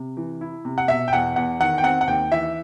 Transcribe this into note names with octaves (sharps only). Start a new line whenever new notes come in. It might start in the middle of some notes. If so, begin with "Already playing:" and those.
Already playing: C3
E3
E4
C3
F#5
B2 E5
G5
E2 F#5
E2 F#5
D#3 F#5
G5
C4 F#5
F#5
D#2 G5
E3 E5